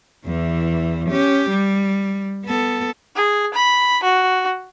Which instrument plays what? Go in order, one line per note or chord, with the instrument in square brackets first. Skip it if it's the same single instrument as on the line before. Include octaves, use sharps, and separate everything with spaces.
[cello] E2 E3
C#4 G4
G3
B3 A4
[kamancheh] G#4
B5
F#4